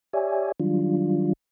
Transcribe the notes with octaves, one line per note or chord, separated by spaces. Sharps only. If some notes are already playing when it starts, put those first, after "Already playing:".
G4 C#5 D5 E5 G#5
D#3 F#3 G3 D4 F4